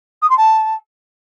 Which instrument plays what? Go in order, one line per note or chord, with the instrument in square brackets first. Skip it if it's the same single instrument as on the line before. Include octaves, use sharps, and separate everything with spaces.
[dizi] D#6
C6
A5